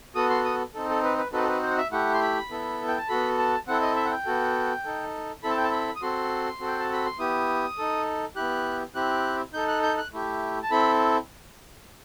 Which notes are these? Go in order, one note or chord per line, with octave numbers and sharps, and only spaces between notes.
B3 F#4 A4 D#6
C6
D#6
C4 D#4 A4
A4
B4
B4
C4 D#4 F#4 A4 B4
A4
B4
C5
F#5
E5
A3 E4 G4 F#5
C6
B5
B3 E4 A4
G5
A5
B3 F#4 A4 B5
A5
C4 E4 A4 F#5
D#5
E5
F#5
G5
B3 F#4 A4
D#4 A4
C4 E4 A4 B5
A5
G5
A5
B5
D#6
C4 F#4 A4 C6
C4 F#4 A4
G5
A5
B5
C6
B3 E4 G4 D#6
D#4 A4
B3 E4 G4 F#6
C4 E4 G4 F#6
D#4 A4 G6
F#6
G6
F#6
A3 E4 G4
A5
C4 E4 A4 B5